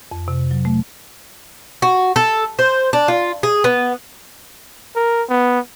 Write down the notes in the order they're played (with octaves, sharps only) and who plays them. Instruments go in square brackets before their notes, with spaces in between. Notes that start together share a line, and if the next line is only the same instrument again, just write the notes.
[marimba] F2
C3
F#3
A3
[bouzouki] F#4
A4
C5
D4
F4
G#4
B3
[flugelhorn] A#4
B3